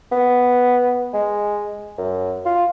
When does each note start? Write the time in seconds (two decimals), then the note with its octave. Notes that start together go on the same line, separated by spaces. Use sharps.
0.12 B3
1.13 G#3
1.98 F#2
2.45 F4